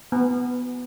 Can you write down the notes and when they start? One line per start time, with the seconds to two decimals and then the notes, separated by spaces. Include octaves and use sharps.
0.12 B3